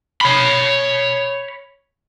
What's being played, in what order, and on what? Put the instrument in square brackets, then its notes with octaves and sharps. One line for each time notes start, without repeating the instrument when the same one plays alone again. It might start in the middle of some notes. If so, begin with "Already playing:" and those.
[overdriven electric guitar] C#5 B5